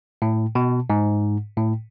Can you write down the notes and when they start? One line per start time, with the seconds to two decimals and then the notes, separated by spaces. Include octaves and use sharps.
0.22 A2
0.55 B2
0.90 G#2
1.57 A2